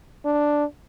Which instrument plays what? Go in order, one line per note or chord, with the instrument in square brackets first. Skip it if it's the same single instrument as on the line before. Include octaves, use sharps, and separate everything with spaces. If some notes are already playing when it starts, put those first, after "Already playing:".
[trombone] D4